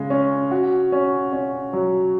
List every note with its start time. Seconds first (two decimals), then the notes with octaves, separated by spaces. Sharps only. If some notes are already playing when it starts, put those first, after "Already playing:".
Already playing: C#3 G#3
0.10 C#4
0.51 F#4
0.92 C#4
1.33 C#4
1.73 F#3